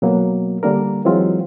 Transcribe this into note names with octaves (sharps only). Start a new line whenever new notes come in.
B2 F#3 A#3
D3 G3 A#3 D4 A#4
E3 F#3 G#3 C4 F4